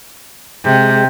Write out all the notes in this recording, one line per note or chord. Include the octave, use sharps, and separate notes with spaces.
C3 G#3 G5